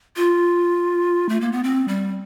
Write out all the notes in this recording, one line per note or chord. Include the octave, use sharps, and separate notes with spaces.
F4
A3
A#3
B3
C4
G3